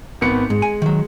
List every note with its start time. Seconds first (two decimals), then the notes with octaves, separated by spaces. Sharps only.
0.21 G#1 B3 C#7
0.50 G#2 G#3
0.62 G#5
0.82 D#3 F#3